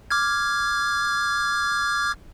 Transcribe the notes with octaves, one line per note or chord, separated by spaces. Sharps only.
D6 F6 G#6